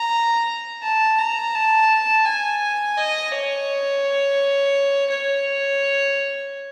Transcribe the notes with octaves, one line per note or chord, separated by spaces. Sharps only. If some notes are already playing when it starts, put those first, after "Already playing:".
Already playing: A#5
A5
A#5
A5
G#5
D#5
C#5
C#5